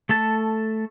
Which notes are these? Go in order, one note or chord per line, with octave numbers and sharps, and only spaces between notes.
A3 A4 A5